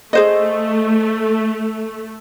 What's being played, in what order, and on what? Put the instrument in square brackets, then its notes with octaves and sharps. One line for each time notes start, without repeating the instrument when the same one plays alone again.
[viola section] A3 [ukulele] G#4 C5 D#5